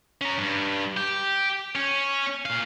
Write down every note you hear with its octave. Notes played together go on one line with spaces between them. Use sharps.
C#4 A#5
G2
G4
C#4
A#2 F5